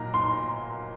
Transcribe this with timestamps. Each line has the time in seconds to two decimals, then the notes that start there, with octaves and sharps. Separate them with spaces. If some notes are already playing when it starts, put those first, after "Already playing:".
Already playing: A#2 F#3 A#3 D#4 A#5
0.14 C6